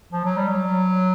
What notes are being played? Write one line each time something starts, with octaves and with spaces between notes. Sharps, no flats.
F3
F#3
G3
F#3